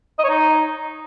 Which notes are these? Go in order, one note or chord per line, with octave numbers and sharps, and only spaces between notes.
D#5
C#5
D#4